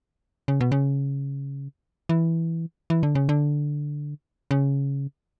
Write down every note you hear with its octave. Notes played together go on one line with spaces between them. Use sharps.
C#3
B2
C#3
E3
E3
D3
C#3
D3
C#3